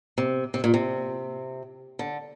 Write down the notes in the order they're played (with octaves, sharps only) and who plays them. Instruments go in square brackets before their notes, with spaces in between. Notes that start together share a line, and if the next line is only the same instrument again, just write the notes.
[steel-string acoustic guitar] C3
C3
A#2
C3
D3